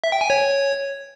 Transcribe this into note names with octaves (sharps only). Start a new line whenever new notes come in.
E5
G5
G#5
C#5